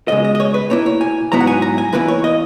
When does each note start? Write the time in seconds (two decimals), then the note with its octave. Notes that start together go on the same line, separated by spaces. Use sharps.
0.08 C#2 B2 G#3 D#5
0.25 D#5
0.35 D#5
0.40 C#5
0.54 B4
0.70 B2 A#3 E4 C#5
0.86 C#5
1.01 G#5
1.32 G#2 F#3 B3 E4 A#5
1.40 F#5
1.47 G#5
1.62 A#5
1.78 G#5
1.93 E2 B2 A#3 E4 B4
2.08 C#5
2.24 D#5